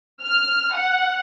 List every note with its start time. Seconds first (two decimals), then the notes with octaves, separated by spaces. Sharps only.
0.23 F6
0.75 F#5